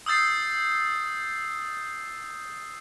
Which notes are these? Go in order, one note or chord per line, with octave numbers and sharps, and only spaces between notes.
D#6 E6 G6 A6 C7